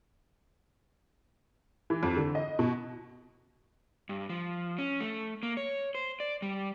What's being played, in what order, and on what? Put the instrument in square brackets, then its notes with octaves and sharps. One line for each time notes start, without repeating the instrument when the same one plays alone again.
[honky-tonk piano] E3
F2
D3
D#5
B2
[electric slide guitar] G2
F3
C#4
A3
A#3
C#5
C5
D5
G3